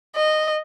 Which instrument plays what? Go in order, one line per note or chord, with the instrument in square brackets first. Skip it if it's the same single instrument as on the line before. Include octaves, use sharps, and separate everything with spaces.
[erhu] D#5